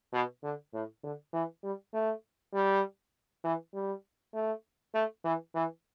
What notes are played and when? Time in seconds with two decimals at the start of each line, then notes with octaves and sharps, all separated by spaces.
0.13 B2
0.43 D3
0.73 A2
1.03 D3
1.33 E3
1.63 G3
1.93 A3
2.54 G3
3.44 E3
3.74 G3
4.34 A3
4.94 A3
5.24 E3
5.55 E3